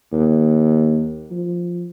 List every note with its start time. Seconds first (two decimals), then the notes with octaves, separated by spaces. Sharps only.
0.12 D#2
1.31 F3